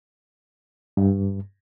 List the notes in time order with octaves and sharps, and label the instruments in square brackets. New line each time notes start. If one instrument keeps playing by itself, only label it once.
[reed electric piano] G2